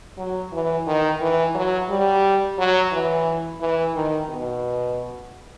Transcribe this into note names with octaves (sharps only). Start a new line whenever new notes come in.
F#3
E3
D#3
E3
F#3
G3
F#3
E3
E3
D#3
B2